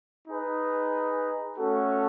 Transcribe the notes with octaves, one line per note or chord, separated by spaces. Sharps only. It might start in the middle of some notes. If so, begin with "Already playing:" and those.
D#4 G#4 B4
A3 C#4 F#4 A4